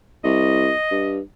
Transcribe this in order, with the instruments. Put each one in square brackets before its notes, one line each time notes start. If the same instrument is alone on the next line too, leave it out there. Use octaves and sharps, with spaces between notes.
[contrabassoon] C2 [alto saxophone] D#5
[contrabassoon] G2